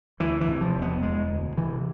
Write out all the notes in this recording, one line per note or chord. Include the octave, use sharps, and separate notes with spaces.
D2 E3
E3
C3
F3
E1
B3
E1 G#3
D2
C3 E3